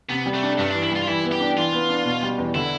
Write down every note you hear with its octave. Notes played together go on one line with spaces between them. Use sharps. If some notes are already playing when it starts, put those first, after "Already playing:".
C3 B3
G3
A3
D4
G2 A3
E3 D4
E4
G3 F4
F4
E3 E4
B3
G4
D4
E3 F4
B3
D4
B2
G3
E2
D3 E4